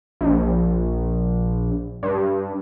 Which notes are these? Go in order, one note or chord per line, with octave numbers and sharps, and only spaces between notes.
A#1
G2